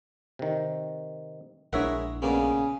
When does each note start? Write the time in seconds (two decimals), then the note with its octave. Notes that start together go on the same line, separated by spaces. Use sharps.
0.39 C3 D#3
1.73 A#1 G#3 D4 E4 A#4 C#5 E5 F#5
2.22 C#3 A#3 B3 D5